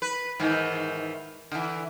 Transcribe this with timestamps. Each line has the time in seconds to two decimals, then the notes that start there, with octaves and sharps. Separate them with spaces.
0.02 B4
0.40 G#2 D#3 E3
1.52 D3 E3